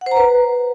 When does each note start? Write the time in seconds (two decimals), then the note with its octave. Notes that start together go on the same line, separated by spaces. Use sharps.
0.01 F#5
0.06 C5
0.11 A#5
0.17 B4